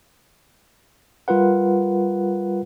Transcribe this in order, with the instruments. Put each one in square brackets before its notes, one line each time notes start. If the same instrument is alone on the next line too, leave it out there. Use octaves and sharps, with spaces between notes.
[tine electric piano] G3 F4 A#4 B4 F#5